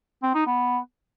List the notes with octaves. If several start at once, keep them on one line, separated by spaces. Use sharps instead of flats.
C4
D#4
B3